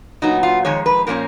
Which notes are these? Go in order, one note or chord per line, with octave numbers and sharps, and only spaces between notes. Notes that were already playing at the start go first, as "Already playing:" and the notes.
A#2 F#3 B3 D#4
F4
F2 D#3 G#3 C#5
B4
A#2 F3 A#3 C#4 A#4